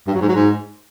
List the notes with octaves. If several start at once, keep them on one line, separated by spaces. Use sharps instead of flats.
G2
F#3
G#2
F#3
G#2